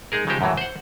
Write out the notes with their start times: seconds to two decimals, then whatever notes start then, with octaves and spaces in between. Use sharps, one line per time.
0.12 G#3 D#4 G#4 A#4
0.27 C#3 F3 G#3 D#4 G4 C5
0.41 F#2 A2 E3 F#3
0.57 C5 F#5